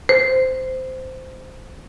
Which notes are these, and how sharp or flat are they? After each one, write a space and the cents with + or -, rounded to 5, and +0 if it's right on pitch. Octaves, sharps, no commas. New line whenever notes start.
C5 -10